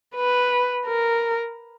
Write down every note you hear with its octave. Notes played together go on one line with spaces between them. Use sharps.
B4
A#4